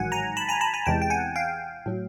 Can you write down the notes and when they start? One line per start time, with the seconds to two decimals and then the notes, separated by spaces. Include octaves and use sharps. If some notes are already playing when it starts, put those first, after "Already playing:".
Already playing: A1 G#2 D#3 F#3 F#5 G#5
0.12 G#5 A#5
0.37 A5 B5
0.49 G#5 A#5
0.61 A5 B5
0.74 G#5 A#5
0.86 E2 C3 E3 G#3 G5 A5
1.02 G5
1.10 F#5 G#5
1.36 F5 G5
1.86 A2 F#3